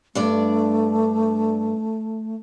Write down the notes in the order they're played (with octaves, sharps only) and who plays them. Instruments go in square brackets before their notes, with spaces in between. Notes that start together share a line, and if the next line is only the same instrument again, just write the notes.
[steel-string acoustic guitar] G2 D4 D5 [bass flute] A3